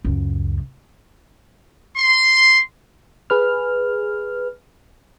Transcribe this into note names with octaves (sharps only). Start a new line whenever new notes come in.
C#2 F#2
C6
G#4 B4 F6